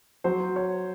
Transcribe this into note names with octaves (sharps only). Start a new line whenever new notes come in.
F#3 C5
C#5